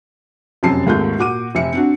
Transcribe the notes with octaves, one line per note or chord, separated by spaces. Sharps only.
F1 F#2 C4 A5 C7
D#2 G#2 A3 C4 F4 G6
A#2 F#4 D6 D#7
F1 E5 C#7
C4 D4 F#4